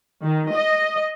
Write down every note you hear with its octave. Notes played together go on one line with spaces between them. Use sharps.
D#3
D#5